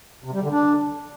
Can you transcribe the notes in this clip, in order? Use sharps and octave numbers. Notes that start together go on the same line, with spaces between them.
C3
G3
D3
D4